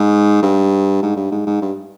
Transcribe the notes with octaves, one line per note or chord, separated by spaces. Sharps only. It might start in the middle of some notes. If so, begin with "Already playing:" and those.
Already playing: G#2
G2
G#2
G2
G#2
G#2
G2